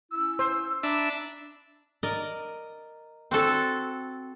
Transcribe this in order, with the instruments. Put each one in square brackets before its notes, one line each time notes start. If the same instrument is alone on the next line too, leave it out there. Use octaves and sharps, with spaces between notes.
[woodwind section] C#4 E4 E6
[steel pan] C5
[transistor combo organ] D4 E5 [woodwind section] A#5 B5 D6
[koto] A#4 D5 D#5 A#5
C4 F#4 A4 D5